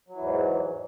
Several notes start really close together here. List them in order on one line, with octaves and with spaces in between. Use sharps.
F#3 E3 E2 G#2